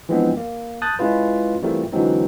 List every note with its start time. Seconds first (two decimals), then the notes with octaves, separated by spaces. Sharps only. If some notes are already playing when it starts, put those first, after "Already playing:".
0.09 E3 F3 G#3 B3 C4 D4
0.37 A#3
0.82 A5 D#6 F#6 G6 A6
0.99 G#3 C#4 E4 F4 B4
1.62 E3 G3 A3 C4 F4 A#4
1.92 D3 E3 F#3 G#3 C4 D#4